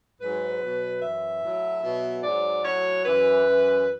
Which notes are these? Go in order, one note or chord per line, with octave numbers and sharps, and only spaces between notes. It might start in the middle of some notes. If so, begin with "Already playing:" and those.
G#2 F#3 B4
B2 F#3
F#2 E3 E5
A2 F#3
B2 F#3
G#2 F#3 D5
A2 F#3 C#5
F#2 E3 B4
F#2 E3